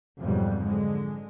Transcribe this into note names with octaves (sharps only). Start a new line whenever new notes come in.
F2 G#2 B2 F#3 G3
D3 G#3